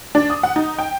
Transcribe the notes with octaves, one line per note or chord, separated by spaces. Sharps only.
D4
D#6
F#5
D#4
G5